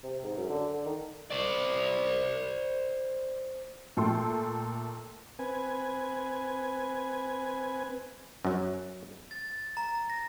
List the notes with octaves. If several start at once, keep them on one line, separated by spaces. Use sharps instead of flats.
C3
G#2
F#2
D3
D3
D#3
C5 D5
A#2 A3 A4 G5 C6
C4 B4 G#5
F#2 F#3
A6
A6
A#5
A#6